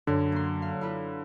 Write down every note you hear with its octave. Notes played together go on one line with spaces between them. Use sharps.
F#2 D3
A#3 C6
F5
E4 F4 B4